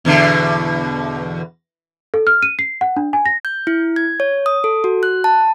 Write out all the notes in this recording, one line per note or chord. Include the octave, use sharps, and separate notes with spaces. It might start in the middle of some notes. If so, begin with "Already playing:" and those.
E2 B2 D3
A4
F6
D#7
C7
F#5
D4
G#5
A#6
G6
E4
G#6
C#5
D#6
A4
F#4
F#6
A5